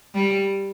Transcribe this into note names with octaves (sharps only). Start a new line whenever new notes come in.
G3